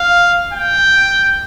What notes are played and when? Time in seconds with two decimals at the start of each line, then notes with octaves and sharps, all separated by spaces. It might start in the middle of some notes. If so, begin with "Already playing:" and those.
Already playing: F5
0.53 G5